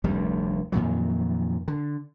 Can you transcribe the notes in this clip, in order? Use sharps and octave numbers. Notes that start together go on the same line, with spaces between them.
F1 D2 G3
F2 A#2 D#3 F#3
D3